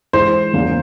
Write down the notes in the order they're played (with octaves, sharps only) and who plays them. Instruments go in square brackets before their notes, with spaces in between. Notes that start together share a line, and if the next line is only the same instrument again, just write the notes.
[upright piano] E3 G#3 E4 [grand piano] C5
[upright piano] E2 C#3 E3 A#3 C#4